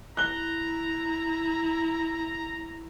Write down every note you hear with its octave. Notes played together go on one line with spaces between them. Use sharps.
E4 A#5 F#6 G7